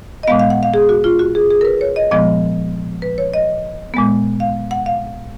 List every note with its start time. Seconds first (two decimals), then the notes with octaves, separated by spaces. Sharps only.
0.23 D#5
0.27 A#2 G#3 B3 F5
0.40 F5
0.50 F#5
0.63 F5
0.74 G#4
0.89 F#4
1.04 F4
1.19 F#4
1.35 G#4
1.51 G#4
1.61 A#4
1.65 B4
1.81 C#5
1.96 D#5
2.11 A#2 F3 G#3 B3 D#5
3.02 B4
3.18 C#5
3.34 D#5
3.94 A#2 G#3 B3
4.40 F5
4.71 F#5
4.86 F5